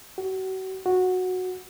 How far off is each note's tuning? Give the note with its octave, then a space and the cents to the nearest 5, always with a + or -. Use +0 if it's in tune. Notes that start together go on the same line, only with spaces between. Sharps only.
F#4 +35
F#4 -10